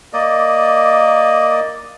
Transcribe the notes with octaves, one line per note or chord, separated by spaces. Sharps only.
A#3 D5 D#5